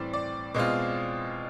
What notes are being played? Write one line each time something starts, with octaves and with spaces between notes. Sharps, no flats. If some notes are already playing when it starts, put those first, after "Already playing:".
Already playing: A2 E3 G3 C4 D5
D5
B2 G#3 C4 F4